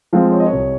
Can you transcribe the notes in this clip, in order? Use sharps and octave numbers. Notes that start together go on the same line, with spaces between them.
F3 G#3 C4 F5
C#5
D#5
C#5
C2